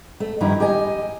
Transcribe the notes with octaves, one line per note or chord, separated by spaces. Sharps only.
A3
G2 D#3 F3 D#4 E4 G4
G4 D#5 G#5